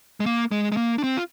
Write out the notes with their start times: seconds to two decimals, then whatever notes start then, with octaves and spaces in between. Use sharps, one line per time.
0.20 G#3
0.26 A#3
0.51 G#3
0.72 G#3
0.77 A#3
0.98 D4
1.04 C4
1.17 F4